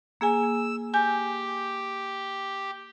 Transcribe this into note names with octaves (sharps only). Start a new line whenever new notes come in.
A#3 G#4 G#5 E6
G4 G#5 G6